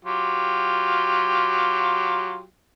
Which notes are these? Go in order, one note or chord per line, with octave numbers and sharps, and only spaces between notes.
F#3 F4 G4